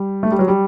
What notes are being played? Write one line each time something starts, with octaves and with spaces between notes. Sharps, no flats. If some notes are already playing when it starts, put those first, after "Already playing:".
Already playing: G3
A3
G3
F#3
G3